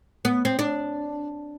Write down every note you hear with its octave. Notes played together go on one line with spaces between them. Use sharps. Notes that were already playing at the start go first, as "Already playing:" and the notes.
B3
C4
D4